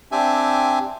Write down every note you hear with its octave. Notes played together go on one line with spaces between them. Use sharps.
C4 D4 G4 E5 G#5